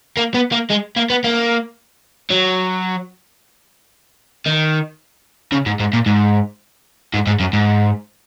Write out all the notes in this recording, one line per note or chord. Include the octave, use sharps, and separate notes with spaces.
A#3
B3
A#3
G#3
A#3
B3
A#3
F#3
D#3
C#3
G#2
G#2
A#2
G#2
G#2
G#2
F#2
G#2